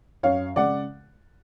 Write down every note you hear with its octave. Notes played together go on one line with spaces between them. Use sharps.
F#2 C#5 F5
C#3 G#3 D5 F#5